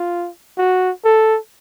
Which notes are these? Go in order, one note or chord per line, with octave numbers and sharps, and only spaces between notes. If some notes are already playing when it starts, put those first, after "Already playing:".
Already playing: F4
F#4
A4